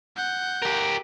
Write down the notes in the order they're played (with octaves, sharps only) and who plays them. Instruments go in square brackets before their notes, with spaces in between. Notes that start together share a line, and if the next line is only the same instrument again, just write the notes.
[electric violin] F#5 G6
[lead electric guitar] G4 A#4